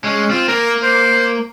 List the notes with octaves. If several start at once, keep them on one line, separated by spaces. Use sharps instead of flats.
G#3 C#4
C4 F4
A#3 A#4
C5